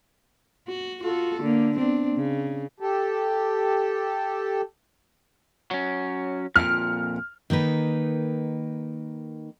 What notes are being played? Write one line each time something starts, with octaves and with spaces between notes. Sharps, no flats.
F#4
F4 F#4 A4
D3 A#3
B3 C4 D4
C#3
G4 A4
F#3 C#4
F2 A#2 F6
D#3 A#3 D#4 B4